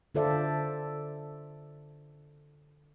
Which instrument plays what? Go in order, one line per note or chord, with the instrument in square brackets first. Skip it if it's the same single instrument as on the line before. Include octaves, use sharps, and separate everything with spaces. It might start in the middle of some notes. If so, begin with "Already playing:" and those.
[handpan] D3 F4 A4 C5 D5 E5